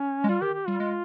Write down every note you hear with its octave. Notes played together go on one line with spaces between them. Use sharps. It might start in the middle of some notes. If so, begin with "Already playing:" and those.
Already playing: C#4
G#3
G3 F4
D#3 G4
G4
G3 F4
G#3